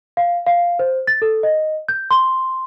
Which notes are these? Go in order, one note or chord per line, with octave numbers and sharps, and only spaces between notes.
F5
F5
C5
A6
A4
D#5
G6
C6